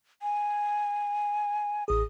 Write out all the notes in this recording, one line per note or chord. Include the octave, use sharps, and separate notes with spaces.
G#5
A1 G#4 D#6